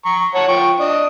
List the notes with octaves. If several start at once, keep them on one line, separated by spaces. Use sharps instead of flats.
A#5 C#6
C#5 F#5 A5
F3 G5 C#6
D4 D#5